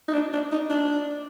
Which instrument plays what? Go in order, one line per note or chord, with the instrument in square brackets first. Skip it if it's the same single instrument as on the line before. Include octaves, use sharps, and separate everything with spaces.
[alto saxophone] D#4
D4
D4
D#4
D4